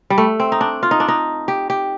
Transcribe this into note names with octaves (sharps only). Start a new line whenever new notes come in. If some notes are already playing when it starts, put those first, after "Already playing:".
G3
A3
C4
D#4
D4
F4
D#4
D4
D#4
G4
G4